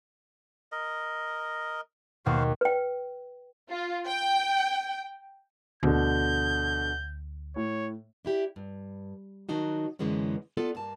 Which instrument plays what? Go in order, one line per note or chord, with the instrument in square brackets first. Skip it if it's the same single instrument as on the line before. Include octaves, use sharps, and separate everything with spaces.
[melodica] A#4 D#5
[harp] D#2 B2 [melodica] F#4 C5 F5
[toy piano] B4 G5
[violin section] F4
G5
[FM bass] D2 [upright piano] B2 D3 [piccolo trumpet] G6
[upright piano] A2 [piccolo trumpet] C#5
[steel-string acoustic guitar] D4 E4 G4
G2
D#3 F#3 D4 D#4 F#4
F#2 D3 E3 G#3 B3 C#4
B3 F4 A4 D5
G2 A#3 A5